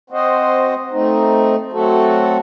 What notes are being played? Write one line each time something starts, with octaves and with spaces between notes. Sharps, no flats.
C4 F#4 C5 D#5
A3 C4 D#4
F#3 A3 C4 F#4 A4